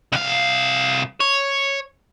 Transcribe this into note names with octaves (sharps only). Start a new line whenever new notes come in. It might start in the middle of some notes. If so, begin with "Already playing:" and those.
C2 F5
C#5